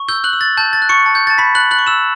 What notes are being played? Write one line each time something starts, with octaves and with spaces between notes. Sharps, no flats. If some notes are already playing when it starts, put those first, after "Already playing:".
Already playing: C#6
E6 G6 G7
F#6 F#7
E6
A6
A5 G6
A6
F#6
C#6 C#7
A5
G6
A5 A6
B5 B6
F#6 F#7
F#6 F#7
C#6
E6 E7